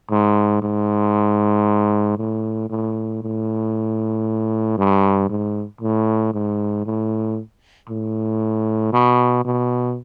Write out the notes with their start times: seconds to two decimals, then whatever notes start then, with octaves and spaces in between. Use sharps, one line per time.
0.11 G#2
0.62 G#2
2.17 A2
2.70 A2
3.22 A2
4.78 G2
5.29 G#2
5.81 A2
6.34 G#2
6.86 A2
7.89 A2
8.93 B2
9.45 B2